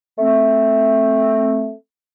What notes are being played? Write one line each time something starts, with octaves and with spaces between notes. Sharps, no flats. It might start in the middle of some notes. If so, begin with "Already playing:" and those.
A3 C4